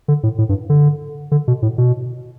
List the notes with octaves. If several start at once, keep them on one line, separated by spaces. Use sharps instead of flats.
D3
A2
A2
G2
D3
D3
B2
A2
B2